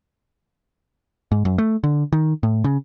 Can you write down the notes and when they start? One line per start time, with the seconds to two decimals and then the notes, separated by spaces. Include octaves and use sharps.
1.32 G#2
1.45 F#2
1.58 A3
1.84 D3
2.12 D#3
2.43 A2
2.64 C#3